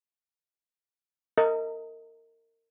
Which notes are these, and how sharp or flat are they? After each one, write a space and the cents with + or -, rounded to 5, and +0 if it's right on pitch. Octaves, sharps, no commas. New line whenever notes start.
A#4 -30 D#5 +20